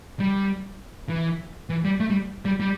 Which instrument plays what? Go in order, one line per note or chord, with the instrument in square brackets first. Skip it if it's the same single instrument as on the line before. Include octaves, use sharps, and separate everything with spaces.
[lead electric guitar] G3
E3
E3
G3
A3
G3
G3
G3